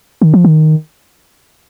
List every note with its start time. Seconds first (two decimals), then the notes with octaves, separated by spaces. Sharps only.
0.22 D#3
0.34 F3
0.44 D#3